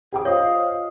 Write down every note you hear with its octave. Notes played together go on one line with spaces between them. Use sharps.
G4 G#4 G5 D6
F4 C5 C#5 D#5 F5